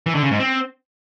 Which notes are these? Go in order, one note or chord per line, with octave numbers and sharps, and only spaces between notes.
E3
D3
C#3
G#2
C4